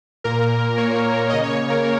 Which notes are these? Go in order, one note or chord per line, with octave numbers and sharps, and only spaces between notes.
A#2 A#3 A#4
A#2 A#3 C#5
C#3 A#3 D#5
C#5
C#5
A#4
C#3 A#3